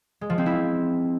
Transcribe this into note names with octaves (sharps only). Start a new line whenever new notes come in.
G#3
F3
C4
E4